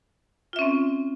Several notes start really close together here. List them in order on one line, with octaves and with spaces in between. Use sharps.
F4 E5 C#4 C4